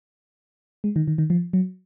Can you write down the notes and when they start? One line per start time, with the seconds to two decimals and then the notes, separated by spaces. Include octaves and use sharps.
0.84 G#3
0.96 D#3
1.08 D#3
1.18 D#3
1.30 F3
1.53 F#3